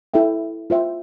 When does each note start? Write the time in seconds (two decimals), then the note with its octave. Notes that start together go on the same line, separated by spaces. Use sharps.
0.14 E4 A4 E5 G5
0.70 F4 C5 E5 G5